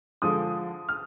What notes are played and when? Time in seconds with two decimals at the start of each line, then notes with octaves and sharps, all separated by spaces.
0.22 D3 F3 G#3 D#6
0.89 F6